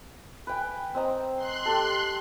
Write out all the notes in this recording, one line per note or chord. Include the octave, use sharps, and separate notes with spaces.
B4 G5 G#5
C4 D#5 A#5
C6 F#6
G4 A4